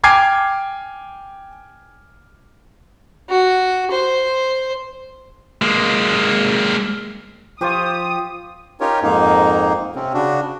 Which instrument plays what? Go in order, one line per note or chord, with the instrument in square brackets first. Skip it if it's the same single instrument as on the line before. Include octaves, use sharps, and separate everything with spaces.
[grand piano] G5 G#5 D6 F6 G#6 C7
[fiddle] F#4
C5
[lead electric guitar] G#3 A#3
[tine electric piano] F3 F4 [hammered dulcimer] G4 C5 C#6 [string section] D#6
[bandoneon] C#4 D#4 F4 G4 A#4 C#5
F2 G#2 A#3 D#4
C3 C4 C#4
C#3 D4 F#4